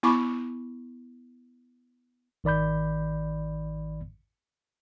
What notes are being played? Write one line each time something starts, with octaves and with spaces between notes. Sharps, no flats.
B3 E4 B5 C#6 D6
G#1 D#3 D5 B5 G6